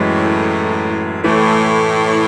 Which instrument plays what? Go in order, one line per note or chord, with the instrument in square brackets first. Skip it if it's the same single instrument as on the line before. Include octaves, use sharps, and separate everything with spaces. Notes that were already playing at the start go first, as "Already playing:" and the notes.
Already playing: [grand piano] F#2 E3 G#3 [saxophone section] A2
[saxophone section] A2 [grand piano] E3 A3